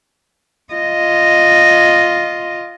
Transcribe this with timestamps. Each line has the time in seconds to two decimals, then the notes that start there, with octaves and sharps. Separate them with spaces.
0.74 F4 D#5